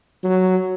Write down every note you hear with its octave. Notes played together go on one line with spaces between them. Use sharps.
F#3